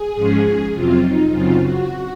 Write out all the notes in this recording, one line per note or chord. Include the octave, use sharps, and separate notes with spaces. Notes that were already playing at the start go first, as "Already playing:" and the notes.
Already playing: G#4
G#2 F3 G#3 C#4
F2 C3 F#3 C4 F4
D#4
F#2 C#3 F#3 C4 F4
F#4